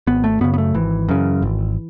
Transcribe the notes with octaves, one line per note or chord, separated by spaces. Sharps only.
G#1 B3
A3
F#2 C#3 B3
B3
A3
G#1 E3
F#2 C#3
G#1